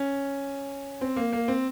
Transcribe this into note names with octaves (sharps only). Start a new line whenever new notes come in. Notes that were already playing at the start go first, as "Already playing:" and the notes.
Already playing: C#4
C4
A#3
A#3
C4